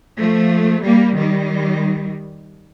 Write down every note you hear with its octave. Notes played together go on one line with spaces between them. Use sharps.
F3 A3
G3 A#3
D#3 G3